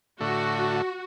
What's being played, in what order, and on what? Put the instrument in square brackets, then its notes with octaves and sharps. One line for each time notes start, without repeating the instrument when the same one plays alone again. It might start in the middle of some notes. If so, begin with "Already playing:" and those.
[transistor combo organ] A2 D3 A3 [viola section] F#4